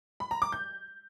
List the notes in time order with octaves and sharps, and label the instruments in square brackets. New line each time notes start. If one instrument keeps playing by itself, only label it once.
[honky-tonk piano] B5
A#5
D6
G6